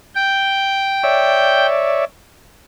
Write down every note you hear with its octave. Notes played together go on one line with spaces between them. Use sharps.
G5
C#5 D5 E5